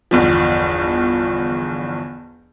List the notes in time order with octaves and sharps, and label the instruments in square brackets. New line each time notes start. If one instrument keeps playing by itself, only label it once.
[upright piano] G1 E2 F3